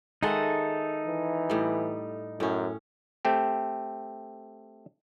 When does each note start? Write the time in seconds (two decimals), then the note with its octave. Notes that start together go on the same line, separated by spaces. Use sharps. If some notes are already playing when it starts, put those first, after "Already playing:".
0.23 D#3 G#3 D#4 A4 E5 F#5
1.07 E3
1.50 A2 G3
2.40 F#2 A2 C#4
3.25 A3 C4 G4